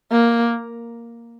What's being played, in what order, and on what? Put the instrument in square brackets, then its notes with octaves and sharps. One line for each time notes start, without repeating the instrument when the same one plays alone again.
[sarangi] A#3